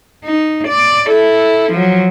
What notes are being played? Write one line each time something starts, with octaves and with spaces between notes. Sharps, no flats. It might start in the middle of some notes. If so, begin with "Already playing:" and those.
D#4
D5
E4 A4
F3 F#3